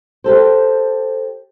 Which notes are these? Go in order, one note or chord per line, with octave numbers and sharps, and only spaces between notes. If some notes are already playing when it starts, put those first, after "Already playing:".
G4 A4 C5